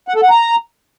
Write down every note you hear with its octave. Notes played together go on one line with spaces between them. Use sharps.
F#5
A4
F#5
A#5